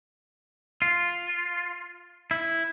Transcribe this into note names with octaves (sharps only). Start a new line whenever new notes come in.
F4
E4